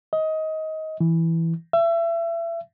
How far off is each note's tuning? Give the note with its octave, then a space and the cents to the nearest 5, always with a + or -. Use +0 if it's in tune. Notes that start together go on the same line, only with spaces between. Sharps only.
D#5 +20
E3 +0
E5 +30